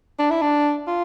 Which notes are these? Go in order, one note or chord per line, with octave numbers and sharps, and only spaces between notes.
D4
E4
D4
F4